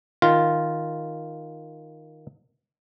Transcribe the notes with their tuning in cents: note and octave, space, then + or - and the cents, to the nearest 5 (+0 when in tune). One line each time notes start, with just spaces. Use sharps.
D#3 +0 F4 +0